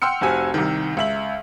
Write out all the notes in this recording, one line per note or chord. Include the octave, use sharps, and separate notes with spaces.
F#5 G5 C6 E6 F6 C#7
F1 C4 F#4 G4 G#5 E6
C2 C3 D#3
C#2 E5 F#7